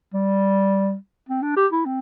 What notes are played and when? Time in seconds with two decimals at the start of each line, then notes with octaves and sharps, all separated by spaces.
0.13 G3
1.29 C4
1.42 D4
1.56 G4
1.72 E4
1.86 C4